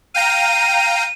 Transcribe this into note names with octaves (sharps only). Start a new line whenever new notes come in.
F5 G5 A#5 D#7